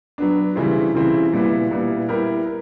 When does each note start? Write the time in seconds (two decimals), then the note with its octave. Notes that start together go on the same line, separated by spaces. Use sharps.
0.18 F#3 B3 D4
0.56 C#3 E3 G3 C4 E4
0.94 C#3 E3 G3 C4 E4
1.33 A#2 G3 B3 E4
1.71 A#2 G3 B3 E4
2.09 G3 B3 E4 G4 A#4
2.46 A#4